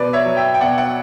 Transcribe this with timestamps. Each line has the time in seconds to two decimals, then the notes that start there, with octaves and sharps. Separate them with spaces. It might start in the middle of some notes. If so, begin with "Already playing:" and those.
Already playing: B2 B4 D5
0.13 C#5 E5
0.25 F#3
0.37 E5 G5
0.54 G5
0.61 B2 D5 F#5
0.78 D5 F#5